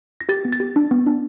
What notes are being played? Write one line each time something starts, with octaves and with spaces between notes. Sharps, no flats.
A#6
G4 A6
B3
A6
G4
D4
B3
D4